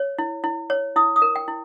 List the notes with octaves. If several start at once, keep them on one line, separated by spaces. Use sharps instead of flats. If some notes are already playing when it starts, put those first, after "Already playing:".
Already playing: C#5
E4
E4
C#5
E4 D#6
D#6
A#4
G5
E4